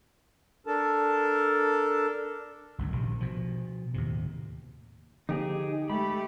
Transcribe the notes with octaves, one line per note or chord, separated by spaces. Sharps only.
D4 A4 A#4 A5
G1 C#2 F#2
A#1 C3 D#3
B2 F3
D#2 A2 C3
D3 F3 A#3 D#4 G4 G#4
G#3 A3 G4 B5